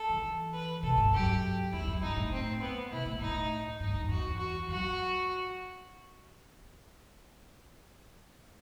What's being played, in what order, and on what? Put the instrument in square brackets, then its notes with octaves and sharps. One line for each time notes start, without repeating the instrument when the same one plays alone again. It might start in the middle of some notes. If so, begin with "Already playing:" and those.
Already playing: [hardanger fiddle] A4
[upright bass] E3
[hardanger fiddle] B4
[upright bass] B2 [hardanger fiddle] A4
[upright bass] G2
[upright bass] F#2 [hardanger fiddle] G4
[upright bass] E2 [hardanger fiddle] E4
[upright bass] F#2
[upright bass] G2 [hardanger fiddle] D#4
[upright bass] A2
[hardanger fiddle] C4
B3
[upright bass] B2 [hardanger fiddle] E4
[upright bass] A2
[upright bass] A2 [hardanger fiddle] D#4
[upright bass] G2 [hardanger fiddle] D#4
[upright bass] E2
[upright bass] E2 [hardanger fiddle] F#4
[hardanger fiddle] F#4
[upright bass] F#2 [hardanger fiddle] F#4